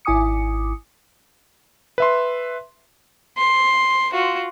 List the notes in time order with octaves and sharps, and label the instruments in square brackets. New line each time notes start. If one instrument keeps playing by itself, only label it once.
[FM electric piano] G#1 E4 G#5 D6 D#6 C#7
[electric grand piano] B4 E5 C6
[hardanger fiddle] C6
F4 F#4